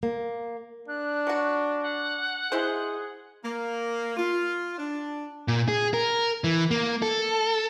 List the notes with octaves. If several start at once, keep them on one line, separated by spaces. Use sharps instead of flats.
A#3
D4 F#6
F#3 F#4
F#5
G#3 E4 G#4 C5
A#3
F4
D4
A#2
G#4
A#4
E3
A#3
A4